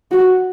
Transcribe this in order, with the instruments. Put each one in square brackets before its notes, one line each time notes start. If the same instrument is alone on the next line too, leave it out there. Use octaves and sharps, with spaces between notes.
[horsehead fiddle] F#4